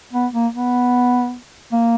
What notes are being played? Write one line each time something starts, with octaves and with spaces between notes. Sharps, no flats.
B3
A#3
B3
A#3